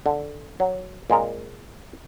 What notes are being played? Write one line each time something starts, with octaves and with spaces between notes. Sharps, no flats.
D3
F#3
A#2 G#3 C4 A#4